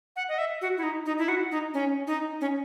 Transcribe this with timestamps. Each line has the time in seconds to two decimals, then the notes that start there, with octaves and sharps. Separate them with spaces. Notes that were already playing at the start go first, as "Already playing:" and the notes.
0.16 F#5
0.29 D#5
0.38 E5
0.61 F#4
0.78 E4
0.83 D#4
1.06 D#4
1.18 E4
1.28 F#4
1.51 D#4
1.74 C#4
2.07 D#4
2.41 C#4